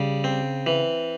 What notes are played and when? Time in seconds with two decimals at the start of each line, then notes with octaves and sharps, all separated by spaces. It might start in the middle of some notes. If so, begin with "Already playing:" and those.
Already playing: C#3 G3
0.24 C4
0.66 E3